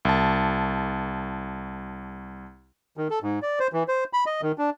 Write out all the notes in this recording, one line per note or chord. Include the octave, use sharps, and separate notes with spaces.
C2 A5
D#3
A4
G#2
D5
C5
E3
C5
B5
D#5
D#3
D4